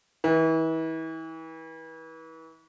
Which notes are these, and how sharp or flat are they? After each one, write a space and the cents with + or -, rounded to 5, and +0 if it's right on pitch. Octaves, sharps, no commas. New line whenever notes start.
E3 -35